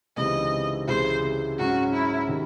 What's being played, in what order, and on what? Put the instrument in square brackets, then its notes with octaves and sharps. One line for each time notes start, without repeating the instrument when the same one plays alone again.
[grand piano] C#2 C3 E3 C4 D#4 [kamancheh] D#5
[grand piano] C#2 C3 E3 G#3 [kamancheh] C5
[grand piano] G#2 F#3 C#4 [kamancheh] F#4
[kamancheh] E4
[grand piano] C3 D#3